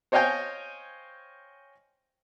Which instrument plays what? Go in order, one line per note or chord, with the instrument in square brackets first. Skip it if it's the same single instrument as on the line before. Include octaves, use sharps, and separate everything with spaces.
[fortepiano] C5 C#5 D#5 F5 G5 G#5